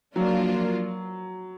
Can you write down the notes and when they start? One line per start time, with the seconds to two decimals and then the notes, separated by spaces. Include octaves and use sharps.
0.16 F3 F#3 A#3 D4 F4 A#4